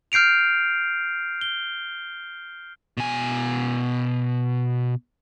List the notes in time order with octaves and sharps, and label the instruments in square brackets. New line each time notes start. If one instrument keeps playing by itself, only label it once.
[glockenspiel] F6 G6 C7 D7 F7
G7
[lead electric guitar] B2 G#5